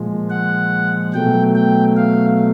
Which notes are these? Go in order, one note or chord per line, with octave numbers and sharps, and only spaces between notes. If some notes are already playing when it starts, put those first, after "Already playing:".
Already playing: A#2 F3 G#3
F#5
B2 F#3 A3 G5
G5
F5